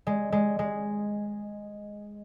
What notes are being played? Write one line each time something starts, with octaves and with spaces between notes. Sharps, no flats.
G#3
G#3
G#3